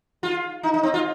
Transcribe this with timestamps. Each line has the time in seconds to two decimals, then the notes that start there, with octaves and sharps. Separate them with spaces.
0.23 F4
0.63 D#4
0.74 D#4
0.83 C4
0.94 F4